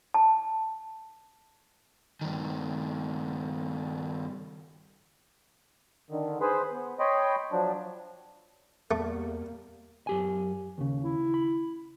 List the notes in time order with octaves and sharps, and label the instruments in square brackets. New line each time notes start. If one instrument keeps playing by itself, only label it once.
[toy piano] A5
[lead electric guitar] G2 D#3
[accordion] D3 D#3
G#4 B4 C5 B5
B3
C#5 D#5 G5 B5 C6
F3 F#3 D4
[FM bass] E2 [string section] G3 A#3 [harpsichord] A3
[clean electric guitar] F#2 G4 G#5
D#2 C#3
[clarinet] E4
[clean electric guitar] B5